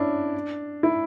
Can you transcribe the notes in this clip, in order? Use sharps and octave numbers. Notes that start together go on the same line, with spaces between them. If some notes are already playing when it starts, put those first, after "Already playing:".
Already playing: C#4 D4 E4
E4